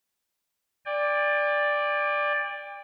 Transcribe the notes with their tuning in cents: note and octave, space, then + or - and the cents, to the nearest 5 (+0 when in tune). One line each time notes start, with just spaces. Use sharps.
D5 +0 G5 +40